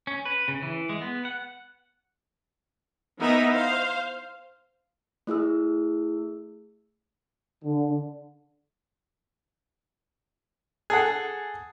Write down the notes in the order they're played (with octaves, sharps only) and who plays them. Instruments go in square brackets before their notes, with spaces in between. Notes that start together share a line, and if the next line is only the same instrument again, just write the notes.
[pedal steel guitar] C#4
B4
C#3
E3
G#3
B3
F#5
[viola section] E3 B3 D#4 A#4 D#5 E5
C5 F5
[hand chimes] A3 E4 G#4 E6
[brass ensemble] D3
[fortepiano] G#4 A4 F#5